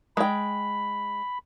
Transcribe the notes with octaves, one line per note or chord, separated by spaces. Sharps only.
G#3 G5 B5